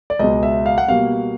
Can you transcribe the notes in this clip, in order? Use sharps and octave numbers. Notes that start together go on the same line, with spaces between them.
D5
C#2 B2 G#3 D#5
E5
F5
F#5
B2 G3 A#3 F5